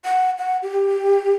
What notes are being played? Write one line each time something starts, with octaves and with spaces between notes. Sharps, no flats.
F#5
F#5
G4